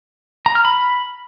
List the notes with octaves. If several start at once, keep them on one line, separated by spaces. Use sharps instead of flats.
A#5
F6
B5